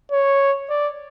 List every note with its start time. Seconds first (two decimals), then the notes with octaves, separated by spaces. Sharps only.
0.12 C#5
0.69 D5